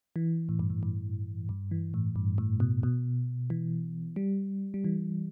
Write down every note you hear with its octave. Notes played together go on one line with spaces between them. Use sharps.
E3
A2
G2
A2
G2
G2
E3
A2
G2
A2
B2
B2
E3
G3
G3
E3